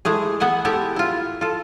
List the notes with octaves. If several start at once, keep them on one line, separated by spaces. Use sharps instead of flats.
E3 G#3 A3 G#4
B3 E5 F#5 G#5
G#3 E4 G4 A4 E5
E4 F4
F4 A4